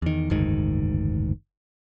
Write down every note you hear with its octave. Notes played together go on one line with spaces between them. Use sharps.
E2 D#3
F#1 D2 G#2 D#3